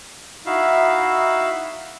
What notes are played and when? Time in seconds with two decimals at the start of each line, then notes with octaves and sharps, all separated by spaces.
0.46 D#4 E4 F#4 E5 F5